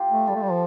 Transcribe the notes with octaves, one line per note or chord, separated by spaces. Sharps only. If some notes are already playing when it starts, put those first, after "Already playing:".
Already playing: F4 G4
A3
G3 A4
A3
G3
F3